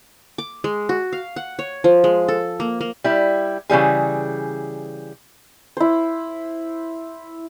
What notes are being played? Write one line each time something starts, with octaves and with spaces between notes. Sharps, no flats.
D6
G#3
F#4
F5
F#5
C#5
F3
G#3
A4
A#3
A#3
G3 E4
C#3 E3 G3 G#4
E4 C5